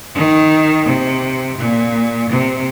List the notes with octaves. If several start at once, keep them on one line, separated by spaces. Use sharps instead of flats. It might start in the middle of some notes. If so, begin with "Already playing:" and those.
D#3
C3
A#2
C3